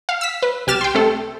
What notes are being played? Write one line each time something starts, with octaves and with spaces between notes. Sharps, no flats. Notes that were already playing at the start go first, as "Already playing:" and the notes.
F5
E6 B6
B4
C2 G4 F6 A6 E7
G5 C6
A3 C4 A4